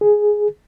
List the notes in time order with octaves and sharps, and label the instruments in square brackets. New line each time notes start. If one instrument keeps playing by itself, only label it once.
[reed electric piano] G#4